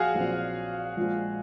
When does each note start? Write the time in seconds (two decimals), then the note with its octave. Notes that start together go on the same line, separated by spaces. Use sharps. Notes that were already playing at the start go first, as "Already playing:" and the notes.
Already playing: A#1 F#3 F#4 G#4 F5
0.15 A#1 A#2 F#3 C4
0.97 A#1 A#2 F3 G#3